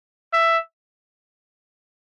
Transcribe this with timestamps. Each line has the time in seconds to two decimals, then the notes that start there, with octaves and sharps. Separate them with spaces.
0.33 E5